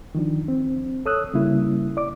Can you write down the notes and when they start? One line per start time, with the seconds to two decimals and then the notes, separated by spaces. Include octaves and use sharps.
0.15 D#3 F3 D4
0.48 C4
1.06 A4 C#5 D#6 E6 F#6
1.34 C#3 G3 A#3 E4
1.97 D5 D6